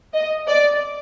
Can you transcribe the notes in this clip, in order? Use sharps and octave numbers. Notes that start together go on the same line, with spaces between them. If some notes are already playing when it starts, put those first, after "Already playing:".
D#5
D5